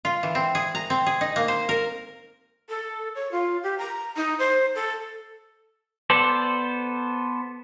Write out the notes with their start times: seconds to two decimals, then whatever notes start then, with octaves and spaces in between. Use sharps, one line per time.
0.05 F4
0.23 E3
0.35 C4
0.55 G#4
0.75 A#5
0.90 C4
1.06 G#4
1.21 D#4
1.36 A#3
1.48 C5
1.69 A#4
2.69 A4
3.15 C#5
3.32 F4
3.63 G4
3.78 A#5
4.16 D#4
4.39 C5
4.75 A4
6.10 B3 A4 C5 D5